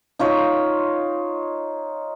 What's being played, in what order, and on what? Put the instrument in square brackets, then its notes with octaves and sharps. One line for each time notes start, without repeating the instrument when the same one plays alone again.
[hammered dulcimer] D#4 F4 C#5